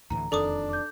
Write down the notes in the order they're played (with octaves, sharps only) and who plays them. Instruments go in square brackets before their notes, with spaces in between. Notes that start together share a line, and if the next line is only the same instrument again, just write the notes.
[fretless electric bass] D2 A2 E3 [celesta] A#5
[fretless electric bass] E1 F2 D#3 [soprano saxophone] D4 [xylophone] A4 D6 D#6
[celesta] D6 G6